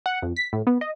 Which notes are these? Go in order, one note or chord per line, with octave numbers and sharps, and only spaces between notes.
F#5
F2
B6
A2
B3
D#5